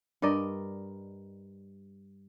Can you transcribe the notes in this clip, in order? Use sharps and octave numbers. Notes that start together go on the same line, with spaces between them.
G2 A#4 D5 D#5